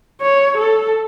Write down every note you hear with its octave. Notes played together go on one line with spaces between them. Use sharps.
C#5
A4